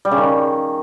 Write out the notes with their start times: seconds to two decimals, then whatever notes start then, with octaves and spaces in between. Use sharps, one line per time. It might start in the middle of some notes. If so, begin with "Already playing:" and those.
0.05 G3
0.11 C#3
0.18 D#3